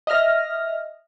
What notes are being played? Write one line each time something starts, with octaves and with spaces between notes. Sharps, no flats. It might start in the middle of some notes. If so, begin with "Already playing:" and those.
D#5 E5 F6 A#6